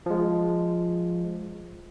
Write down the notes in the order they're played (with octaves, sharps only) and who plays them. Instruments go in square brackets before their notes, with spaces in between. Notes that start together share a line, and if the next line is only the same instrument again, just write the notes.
[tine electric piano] F3 G#3